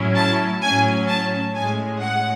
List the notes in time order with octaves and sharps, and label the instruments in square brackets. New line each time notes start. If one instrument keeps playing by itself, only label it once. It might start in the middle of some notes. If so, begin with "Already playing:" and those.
Already playing: [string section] A2 F#3 C#4 E4
A5
A2 F#3 C#4 G#5
A5
A2 G#3 C#4 G#5
F#5